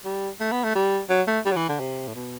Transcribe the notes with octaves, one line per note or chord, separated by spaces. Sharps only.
G3
A3
B3
A3
G3
F#3
A3
G3
F#3
E3
D3
C3
A2
B2